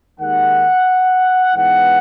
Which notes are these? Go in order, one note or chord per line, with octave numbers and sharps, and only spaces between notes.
D#2 D#3 G#3 F#5
G#2 E3 B3 F#5